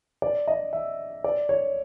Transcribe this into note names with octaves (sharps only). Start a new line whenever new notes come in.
D5
D#5
E5
D5
C#5